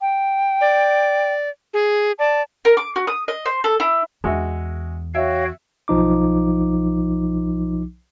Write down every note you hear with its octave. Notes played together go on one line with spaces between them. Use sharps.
G5
D5
G#4
D5 A5
A#4
D6
F#4
D#6
D#5
C5
A4
E4
E2 G#3 F#4 E5
F#4 C#5 E5 F5 G5
B1 F3 D#4 D6